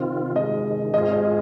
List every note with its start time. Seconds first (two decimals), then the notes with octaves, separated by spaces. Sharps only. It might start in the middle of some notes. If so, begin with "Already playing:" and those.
Already playing: C3 D#3 C4 F4
0.36 C3 D#3 G#3 D#5
0.94 G#2 G#3 C4 F4 G#4 D#5
1.13 D#5